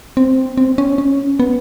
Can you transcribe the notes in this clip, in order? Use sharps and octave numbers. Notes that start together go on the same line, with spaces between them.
C4
C4
C#4
C#4
B3